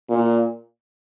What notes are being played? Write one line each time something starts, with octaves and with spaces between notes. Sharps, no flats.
A#2